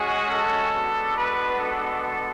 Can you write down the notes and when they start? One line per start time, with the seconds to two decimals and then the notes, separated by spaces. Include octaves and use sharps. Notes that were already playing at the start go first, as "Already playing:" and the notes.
Already playing: G#3 C#4 F#4 G#4
0.30 A4
0.73 G#3 B3 D4 F#4
1.16 B4
1.59 A4